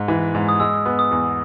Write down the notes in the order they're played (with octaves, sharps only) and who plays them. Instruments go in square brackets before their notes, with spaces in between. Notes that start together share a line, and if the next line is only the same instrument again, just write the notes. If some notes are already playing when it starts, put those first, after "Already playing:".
Already playing: [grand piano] G#2
E3
G#2
[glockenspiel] D#6
[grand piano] G#3 [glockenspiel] E6
[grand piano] B3
[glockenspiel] D#6
[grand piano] E2